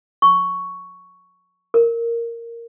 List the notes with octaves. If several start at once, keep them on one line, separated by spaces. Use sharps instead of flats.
C#6
A#4